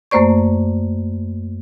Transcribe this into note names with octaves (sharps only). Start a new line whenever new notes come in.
F#2 A3 A#3 C5 D5 C#6